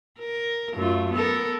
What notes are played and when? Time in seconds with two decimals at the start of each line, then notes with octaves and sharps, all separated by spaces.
0.20 A#4
0.74 F#2 A3 F4
1.12 B3 A4 A#4